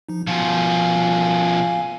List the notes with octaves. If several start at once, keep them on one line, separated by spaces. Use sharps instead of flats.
F3 D#4
B2 F3 F5 G#5